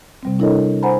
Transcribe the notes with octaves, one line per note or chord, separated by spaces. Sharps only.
C3 G3 C4
D4 E4 A4 A#4 C#5 D#5
C5 F#5 G#5 A#5 B5